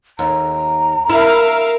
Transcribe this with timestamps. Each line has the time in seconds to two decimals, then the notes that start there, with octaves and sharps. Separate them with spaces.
0.19 D#2 A#5
1.10 E4 A#4 E5 F5